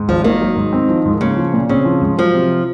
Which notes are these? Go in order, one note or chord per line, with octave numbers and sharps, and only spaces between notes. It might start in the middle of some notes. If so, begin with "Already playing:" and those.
Already playing: G#2
G#1 F3
D#3 A#3
F#3
G#2
C4
F3
G#2
C#3 A#3
F3
A#2
C#3 C4
F3
G#2
F3 F#3
C3